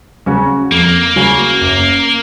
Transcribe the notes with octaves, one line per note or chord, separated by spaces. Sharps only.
C#3 F#3 C#4 F#4
F2 A#3
C#3 F#3 C#4 F#4
F#1